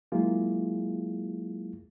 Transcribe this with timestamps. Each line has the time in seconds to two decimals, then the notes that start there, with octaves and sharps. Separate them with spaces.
0.12 F#3 G#3 A#3 E4 F4 G#4